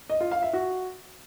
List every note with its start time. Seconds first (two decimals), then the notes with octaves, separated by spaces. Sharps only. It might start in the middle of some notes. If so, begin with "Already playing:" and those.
0.10 D#5
0.21 F4
0.31 F5
0.42 E5
0.53 F#4